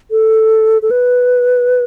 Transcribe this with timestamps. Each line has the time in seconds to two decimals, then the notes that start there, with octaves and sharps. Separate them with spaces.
0.11 A4
0.82 A4
0.91 B4